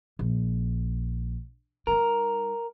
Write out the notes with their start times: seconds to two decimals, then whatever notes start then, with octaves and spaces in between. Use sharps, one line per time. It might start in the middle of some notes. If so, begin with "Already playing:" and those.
0.19 A#1
1.87 G3 D#4 A#4